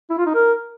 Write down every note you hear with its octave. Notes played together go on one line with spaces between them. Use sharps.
E4
F4
D#4
A#4